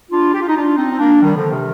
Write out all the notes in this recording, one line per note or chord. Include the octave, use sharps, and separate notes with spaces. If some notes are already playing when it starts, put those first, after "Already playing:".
D4 F4
G4
F4
D#4
D4 F4
C4 D#4
C4
A#3 D4
D#3 G3
D3 F3
C3 D#3